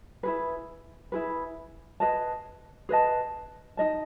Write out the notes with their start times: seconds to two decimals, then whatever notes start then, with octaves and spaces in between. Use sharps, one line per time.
0.23 E4 G#4 B4
1.12 E4 G#4 B4
2.00 G#4 B4 D#5 A5
2.89 G#4 B4 D#5 A5
3.77 D#4 G#4 D#5 A5